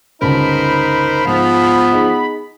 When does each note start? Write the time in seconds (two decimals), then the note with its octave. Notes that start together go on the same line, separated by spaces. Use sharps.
0.22 G1 C#2 D#4 A#4 C5 A5 B5
1.26 G#2 F3 B3
1.92 D#4 G#4